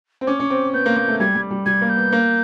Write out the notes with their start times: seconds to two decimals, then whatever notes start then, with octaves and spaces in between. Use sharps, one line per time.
0.21 C4
0.27 C#4 D6
0.40 C#4
0.50 C4
0.73 B3 G6
0.86 A#3
0.97 A#3
1.08 A3
1.20 G3 G#6
1.35 G3
1.51 G3
1.66 G3 G#6
1.81 A#3
1.89 G6
1.96 B3
2.12 A#3